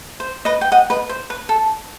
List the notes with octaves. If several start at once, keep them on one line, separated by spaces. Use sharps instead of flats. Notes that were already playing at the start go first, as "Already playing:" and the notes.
C5
B4 D#5
G5
D#5 F#5
B4 D#5
C5
B4
A4